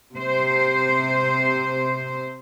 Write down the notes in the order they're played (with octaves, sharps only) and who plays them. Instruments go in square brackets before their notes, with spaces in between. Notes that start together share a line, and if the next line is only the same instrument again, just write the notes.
[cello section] C3 C5